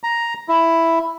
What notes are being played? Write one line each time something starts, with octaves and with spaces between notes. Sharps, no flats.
A#5
E4